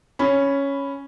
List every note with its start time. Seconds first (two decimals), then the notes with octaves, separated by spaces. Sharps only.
0.19 C#4 B5